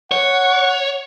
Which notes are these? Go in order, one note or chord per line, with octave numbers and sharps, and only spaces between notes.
C#5 F#5